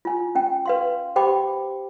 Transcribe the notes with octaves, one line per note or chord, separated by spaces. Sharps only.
F4 G#5
C#4 G5
B4 F5 C6
G4 C5 G5 B5 D6